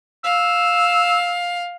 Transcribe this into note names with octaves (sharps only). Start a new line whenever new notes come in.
F5 E6